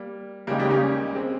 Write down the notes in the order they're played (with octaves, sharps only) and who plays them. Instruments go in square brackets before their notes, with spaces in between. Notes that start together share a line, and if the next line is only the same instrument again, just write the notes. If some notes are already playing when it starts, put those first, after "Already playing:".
Already playing: [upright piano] G3 A#3
[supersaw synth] C#3 G#3 D#4 G4 [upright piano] G3 A#3
[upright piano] G3 A#3
A#3 C#4
G#3 C4